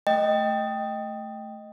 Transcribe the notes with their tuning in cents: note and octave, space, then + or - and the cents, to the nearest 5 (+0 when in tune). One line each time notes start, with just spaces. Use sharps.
A3 -5 D#5 +0 G5 +0